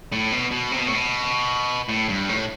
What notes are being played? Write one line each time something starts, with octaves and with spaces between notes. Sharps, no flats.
A2
B2
B2
C3
B2
A2
B2
A2
G2
A2